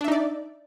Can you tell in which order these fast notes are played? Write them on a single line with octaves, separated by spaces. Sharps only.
D4 E5 D#4 D5